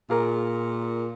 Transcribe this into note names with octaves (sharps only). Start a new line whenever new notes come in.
A#2 F4 G#4 A#4